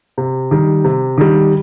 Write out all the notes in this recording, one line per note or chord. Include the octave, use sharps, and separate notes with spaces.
C3
D#3 G3
C3
D#3 G3